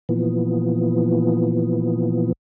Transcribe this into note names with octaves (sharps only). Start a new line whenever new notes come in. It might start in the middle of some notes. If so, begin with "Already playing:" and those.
A#2 E3 F3 B3